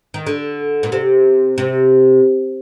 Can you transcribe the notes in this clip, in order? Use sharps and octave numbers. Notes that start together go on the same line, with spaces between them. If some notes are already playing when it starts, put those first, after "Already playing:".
D#3
D3
A#2
C3
C3